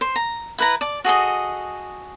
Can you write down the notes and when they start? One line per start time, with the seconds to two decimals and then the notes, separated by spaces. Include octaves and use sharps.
0.01 C5
0.16 A#5
0.58 E4 B4 A#5
0.81 D5 A5
1.04 F#4 G#4 A4 D#5